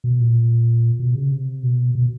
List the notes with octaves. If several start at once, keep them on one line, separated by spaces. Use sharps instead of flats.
B2
A#2
B2
C#3
C3
B2
B2